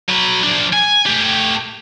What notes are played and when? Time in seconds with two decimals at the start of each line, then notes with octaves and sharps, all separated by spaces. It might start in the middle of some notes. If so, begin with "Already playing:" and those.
0.09 F#3 B4
0.43 F3 D4
0.73 G#5
1.06 A3 G4